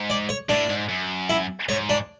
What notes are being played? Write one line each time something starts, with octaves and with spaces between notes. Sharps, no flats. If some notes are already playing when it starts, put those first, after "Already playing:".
Already playing: G#2
D5
C#5
A2 D4
G#2
F#2
E4
G#2 C#5
D4